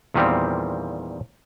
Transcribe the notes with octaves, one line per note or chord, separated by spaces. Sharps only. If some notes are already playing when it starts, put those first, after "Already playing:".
E2 A#2 D#3 G3 C4 F5